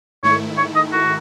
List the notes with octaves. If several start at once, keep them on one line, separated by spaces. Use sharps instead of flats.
G#2 D#3 A3 E4 C#5
C#5
D#5
F#4